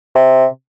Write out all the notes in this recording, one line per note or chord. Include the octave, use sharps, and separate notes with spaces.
C3